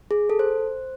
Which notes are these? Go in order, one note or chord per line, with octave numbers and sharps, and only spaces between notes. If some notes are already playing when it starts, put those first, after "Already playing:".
G#4
A4
C5